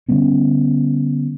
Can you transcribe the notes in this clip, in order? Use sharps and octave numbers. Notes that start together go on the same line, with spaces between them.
D3 G3 B3 C#4